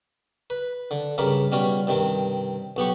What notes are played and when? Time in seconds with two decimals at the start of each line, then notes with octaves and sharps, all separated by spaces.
0.50 B4
0.91 D3
1.18 G2 C#3 A#4 B5 D6
1.52 B2 G3 C#4 F4
1.87 G2 C3 D#3
2.76 B1 B3 G4 C#6